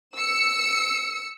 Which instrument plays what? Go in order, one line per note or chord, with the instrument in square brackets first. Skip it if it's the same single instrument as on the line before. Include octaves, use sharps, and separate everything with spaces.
[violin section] E6 C#7